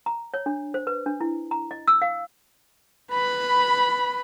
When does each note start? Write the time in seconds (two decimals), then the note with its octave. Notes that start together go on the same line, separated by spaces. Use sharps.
0.06 A#5
0.34 C#5
0.46 D4
0.74 C5
0.87 B4
1.06 D4
1.21 E4
1.51 A#5
1.71 D#5
1.88 E6
2.02 F5
3.12 B4 B5